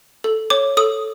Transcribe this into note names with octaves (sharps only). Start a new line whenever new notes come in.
A4
C#5 D6
A4 D#6